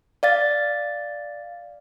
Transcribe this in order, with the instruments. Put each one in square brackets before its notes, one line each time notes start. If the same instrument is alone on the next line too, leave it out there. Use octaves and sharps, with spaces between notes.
[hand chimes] D5 F5 A6